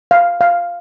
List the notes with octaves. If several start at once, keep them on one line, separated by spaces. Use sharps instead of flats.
F5
F5